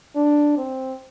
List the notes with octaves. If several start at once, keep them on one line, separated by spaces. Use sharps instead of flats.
D4
C4